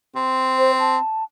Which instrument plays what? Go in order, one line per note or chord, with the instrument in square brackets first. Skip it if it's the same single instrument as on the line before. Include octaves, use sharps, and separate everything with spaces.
[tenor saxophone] C4
[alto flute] C5
A5